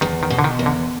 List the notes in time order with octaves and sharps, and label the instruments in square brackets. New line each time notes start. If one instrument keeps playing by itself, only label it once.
[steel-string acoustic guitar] E2 [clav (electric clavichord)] D#3
[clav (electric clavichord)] D#3
[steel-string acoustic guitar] B2
[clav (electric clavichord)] D3
D#3
[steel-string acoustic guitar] E2
[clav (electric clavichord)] D3